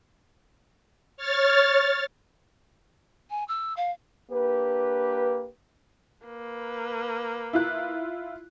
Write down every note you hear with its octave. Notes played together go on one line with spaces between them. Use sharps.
C#5 F6 A6
G#5
E6
F5
A#3 D4 G4 B4
A#3 B4
E4 F4 F#6